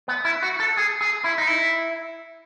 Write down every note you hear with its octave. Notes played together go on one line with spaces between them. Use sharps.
B3
E4
F#4
A4
G#4
G#4
E4
D#4
E4